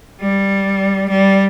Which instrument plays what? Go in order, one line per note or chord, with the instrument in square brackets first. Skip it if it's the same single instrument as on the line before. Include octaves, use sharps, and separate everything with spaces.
[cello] G3
G3